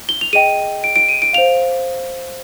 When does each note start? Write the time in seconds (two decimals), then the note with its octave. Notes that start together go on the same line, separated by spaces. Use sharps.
0.09 G7
0.21 F7
0.33 G#4 D#5 G5 D#7
0.84 D7
0.96 D7
1.09 D#7
1.22 D7
1.33 C5 F5 F7